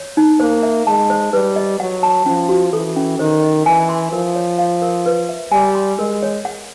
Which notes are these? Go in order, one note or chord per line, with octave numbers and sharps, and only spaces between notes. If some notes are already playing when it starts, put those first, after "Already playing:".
Already playing: C#5
D#4
A#3 C5
E5
G#3 A5
C5
G3 B4
D#5
F#3 F#5
A5
F3 C#4
F#4
E3 A4
C#4
D#3 C5
D#5
E3 G#5
C6
F3 A#4
C#5
F5
A#4
B4
E5
G3 G#5
C6
G#3 A#4
C#5
F#5